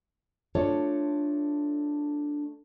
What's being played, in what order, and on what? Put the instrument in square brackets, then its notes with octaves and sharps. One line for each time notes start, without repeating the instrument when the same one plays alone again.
[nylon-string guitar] A3 D4 F4 A4 C#5 D5